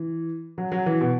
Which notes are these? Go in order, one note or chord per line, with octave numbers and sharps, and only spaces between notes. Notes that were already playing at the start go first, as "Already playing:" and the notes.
Already playing: E3
F#3
F#3
E3
B2